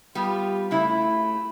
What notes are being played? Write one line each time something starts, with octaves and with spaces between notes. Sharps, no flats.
G3 B3 F4 G4
C#3 A3 E4 B5